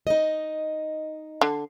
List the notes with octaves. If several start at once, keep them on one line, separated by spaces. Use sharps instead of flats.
D#4 D#5
D3